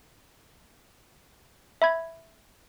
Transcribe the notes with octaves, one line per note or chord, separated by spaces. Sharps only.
E5 B5 G#6